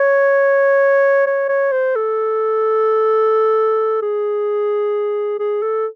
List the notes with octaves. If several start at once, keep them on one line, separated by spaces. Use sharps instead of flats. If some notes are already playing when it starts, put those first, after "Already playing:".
Already playing: C#5
C#5
C#5
C5
A4
G#4
G#4
A4